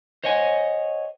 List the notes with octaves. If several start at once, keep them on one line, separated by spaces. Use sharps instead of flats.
C5 C#5 D#5 F#5 G#5